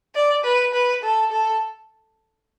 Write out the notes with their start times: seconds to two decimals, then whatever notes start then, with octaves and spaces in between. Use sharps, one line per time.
0.15 D5
0.45 B4
0.74 B4
1.03 A4
1.32 A4